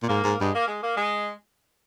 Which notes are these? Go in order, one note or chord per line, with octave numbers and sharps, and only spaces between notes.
A#2
G#2 A#3
G#2
G2 G#3
A#3
G#3
A#3
G#3